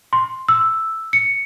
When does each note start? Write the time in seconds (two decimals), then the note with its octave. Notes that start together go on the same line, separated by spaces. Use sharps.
0.13 C6
0.49 E6
1.13 C#7